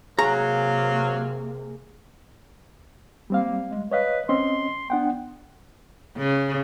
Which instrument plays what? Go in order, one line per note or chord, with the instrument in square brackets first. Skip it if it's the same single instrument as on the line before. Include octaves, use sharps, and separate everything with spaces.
[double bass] C3 A#3 [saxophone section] F#3 F5 [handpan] G#4 [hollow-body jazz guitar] A#5
[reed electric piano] G3 C4 F5 [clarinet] A#3
[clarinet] G#3
[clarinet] B4 [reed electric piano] C#5 D#5 F5
[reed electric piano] C4 C#4 D#5 [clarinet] C6
[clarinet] B3 [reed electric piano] D4 F#5 G5
[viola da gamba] C#3